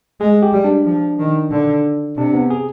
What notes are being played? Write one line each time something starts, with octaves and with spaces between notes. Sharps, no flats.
G#3 G#4
G4
G3
D4
F3
D#3
D3
C3 D4
B3
G#4